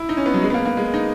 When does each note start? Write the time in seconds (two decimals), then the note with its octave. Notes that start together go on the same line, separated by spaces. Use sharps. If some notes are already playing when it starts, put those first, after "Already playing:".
Already playing: E4
0.09 D#4
0.17 C#4
0.26 B3
0.34 F#3
0.43 G#3
0.50 B3
0.54 A#3
0.65 A#3
0.77 G#3
0.94 D#4